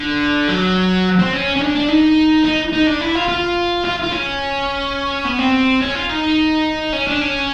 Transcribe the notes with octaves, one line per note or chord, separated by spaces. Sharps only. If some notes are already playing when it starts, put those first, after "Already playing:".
Already playing: D3
F#3
C4
C#4
C#4
D4
D4
D#4
D#4
D#4
D4
E4
F4
F4
F4
F4
C#4
B3
C4
C#4
F4
D#4
C#4
D4
C#4